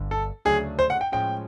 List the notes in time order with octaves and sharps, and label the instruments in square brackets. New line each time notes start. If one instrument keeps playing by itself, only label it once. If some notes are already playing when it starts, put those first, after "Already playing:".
Already playing: [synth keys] G1 G2 D3
[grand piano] A4
[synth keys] D2 C#3 F#3 A3 D4 [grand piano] G#4
[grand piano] C5
F#5
G5
[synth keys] A2 F3 G#3 C#4 [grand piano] G5